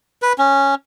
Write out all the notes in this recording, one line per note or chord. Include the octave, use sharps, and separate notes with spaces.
B4
C#4